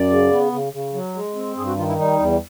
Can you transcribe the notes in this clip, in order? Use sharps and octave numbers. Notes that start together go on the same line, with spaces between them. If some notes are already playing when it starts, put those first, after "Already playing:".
Already playing: F#2 D5
C#3
B3
C#3
C#3
F#3
G#3
C4
G2 G#4
F#4
D#3 F4
E4
G3 D#4
E2